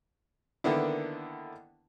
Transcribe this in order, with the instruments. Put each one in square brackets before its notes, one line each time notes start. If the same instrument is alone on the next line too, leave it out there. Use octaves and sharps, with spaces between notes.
[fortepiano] D3 D#3 A#3 B3 D4 E4